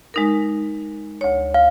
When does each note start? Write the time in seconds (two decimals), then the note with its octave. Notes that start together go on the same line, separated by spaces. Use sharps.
0.14 G#3 D#4 A#4
1.21 D2 C#5
1.54 F5